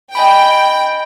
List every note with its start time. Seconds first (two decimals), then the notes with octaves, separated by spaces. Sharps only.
0.15 D#5 G5 G#5 B5